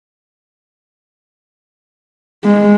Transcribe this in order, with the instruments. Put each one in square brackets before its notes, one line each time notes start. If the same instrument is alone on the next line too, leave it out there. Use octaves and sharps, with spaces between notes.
[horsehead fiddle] G#3